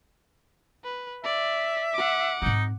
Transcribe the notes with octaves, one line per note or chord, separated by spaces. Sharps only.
B4
D5 E5
F#5 D6
G#2 C4 D#4